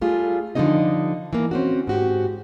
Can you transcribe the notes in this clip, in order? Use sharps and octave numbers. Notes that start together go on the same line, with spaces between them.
G3 A3 F4 G#4
D3 F3 G3 C#4 D#4 D#5
E3 A#3
C4 C#4 F#4
G#2 F#4 G4